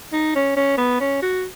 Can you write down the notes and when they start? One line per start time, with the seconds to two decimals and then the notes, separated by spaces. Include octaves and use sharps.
0.13 D#4
0.35 C#4
0.56 C#4
0.78 B3
1.00 C#4
1.22 F#4